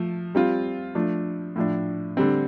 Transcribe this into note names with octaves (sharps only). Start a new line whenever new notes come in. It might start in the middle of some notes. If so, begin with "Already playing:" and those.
Already playing: F3 A3
G3 C4 F4
F3 A3 D4
A2 F3 D4
D3 G3 C4